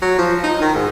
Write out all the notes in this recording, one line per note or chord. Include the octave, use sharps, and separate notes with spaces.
F#3
F3
D#4
D#3
G#2